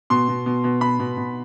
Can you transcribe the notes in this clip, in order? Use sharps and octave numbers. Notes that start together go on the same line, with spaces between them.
B2 C6
B2
B2
B2
B2 B5
B2
B2